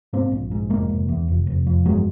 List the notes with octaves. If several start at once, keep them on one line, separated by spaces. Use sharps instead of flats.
G#2 A#3 C4
A#1
G#2
F1 G#3 A#3
F1
E2
F1
F1
F2
G1 F#3 G#3